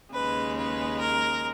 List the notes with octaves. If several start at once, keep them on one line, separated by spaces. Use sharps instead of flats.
D#2 C#3 G#3 B4
B4
A#4